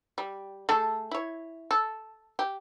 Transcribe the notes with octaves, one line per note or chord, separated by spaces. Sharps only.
G3
A3 G#4 A4
E4 C#5
A4
G4